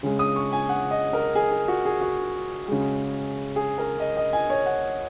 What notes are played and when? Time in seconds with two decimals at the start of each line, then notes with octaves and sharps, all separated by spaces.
0.03 C#3 G#3
0.19 D#6
0.36 C#6
0.52 G#5
0.69 F#5
0.91 D#5
1.13 A#4
1.35 G#4
1.51 G#4
1.68 F#4
1.85 G#4
2.01 F#4
2.68 C#3 G#3
3.56 G#4
3.78 A#4
4.00 D#5
4.17 D#5
4.33 G#5
4.50 C#5
4.66 F#5